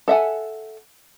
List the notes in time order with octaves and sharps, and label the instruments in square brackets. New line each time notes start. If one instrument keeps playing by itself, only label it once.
[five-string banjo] A4 E5 F#5 G#5